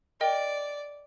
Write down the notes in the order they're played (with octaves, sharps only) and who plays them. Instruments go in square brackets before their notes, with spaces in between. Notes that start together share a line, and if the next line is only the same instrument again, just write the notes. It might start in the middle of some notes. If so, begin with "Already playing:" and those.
[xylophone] A#4 D#5 G5 [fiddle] D5